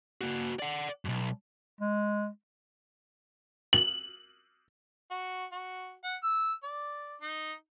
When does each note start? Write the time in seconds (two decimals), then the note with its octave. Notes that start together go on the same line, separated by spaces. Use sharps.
0.21 A#3 F#4
0.59 D5 F#5
1.05 B1 F#2
1.81 G#3
3.73 F#7
5.11 F#4
5.52 F#4
6.04 F#5
6.23 E6
6.63 D5
7.22 D#4